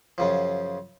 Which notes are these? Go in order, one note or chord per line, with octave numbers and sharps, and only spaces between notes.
F#2 C#3 F3